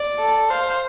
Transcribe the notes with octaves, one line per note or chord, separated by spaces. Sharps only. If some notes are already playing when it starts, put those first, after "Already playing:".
Already playing: D5
A4
C5 F5